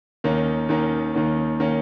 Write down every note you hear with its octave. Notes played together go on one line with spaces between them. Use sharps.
D#2 D#3 A#3 C#4
D#2 D#3 A#3 C#4
D#2 D#3 A#3 C#4
D#3 A#3 C#4